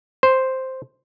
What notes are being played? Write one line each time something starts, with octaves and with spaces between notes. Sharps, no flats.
C5